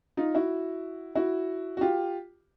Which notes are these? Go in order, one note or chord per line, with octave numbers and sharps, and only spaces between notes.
D#4 F4
E4 F#4
E4 F#4
F#4
F4 G4